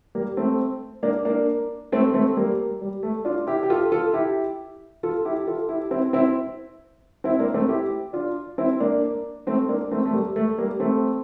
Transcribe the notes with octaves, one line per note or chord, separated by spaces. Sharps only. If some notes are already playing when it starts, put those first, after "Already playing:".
G3 A#3
A3 C4
A#3 D4
A#3 D4
A3 C4
A3 C4
G3 A#3
G3
A3
D4 F4
E4 G4
G4
F4 A4
F4 A4
E4 G4
F4 A4
E4 G4
F4 A4
E4 G4
C4 E4
C4 E4
C4 E4
A#3 D4
A3 C4
E4 G4
D4 F4
C4 E4
A#3 D4
A3 C4
A#3 D4
A3 C4
A3
G3 A#3
A3
G3 A#3
A3 C4